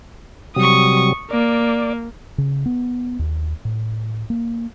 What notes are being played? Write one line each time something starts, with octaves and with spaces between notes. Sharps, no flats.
C3 F#3 G3 C#6 D#6
A#3 D5
C#3
B3
D#2
A2
A#3